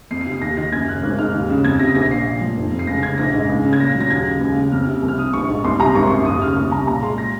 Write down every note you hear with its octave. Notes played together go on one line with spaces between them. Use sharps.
F2 C7
C7
C3
C7
D#2 A#6
D#3 A#6
F#2 G#6
C#3 F#6
G#1 F#6
G#2 F6
D#2
C#3
F2 G#6
C3 A#6
A#1 A#6
A#2 C7
A#2
F3
F1
F2
C7
C#2 A#6
C#3 G#6
A#1 A#6
G#2
C#2
C#3
G#6
A#2 A#6
F#3
A#6
D#2 G#6
C#3
C#2
C#3
F2 F6
C3
C2
F6
C3 D#6
A#1 C#6
G#2
C2 C6
C3 A#5
G#1 C#6
C6
F#2 C#6
D#2 D#6
C#3 F6
C2 C#6
C3 A#5
A#2 A#5
G#3 C6
A#6